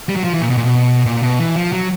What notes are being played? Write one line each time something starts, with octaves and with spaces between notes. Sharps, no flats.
G3
F#3
F3
E3
A#2
B2
A#2
B2
A#2
B2
E3
F3
F#3